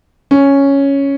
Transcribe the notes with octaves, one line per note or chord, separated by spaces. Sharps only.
C#4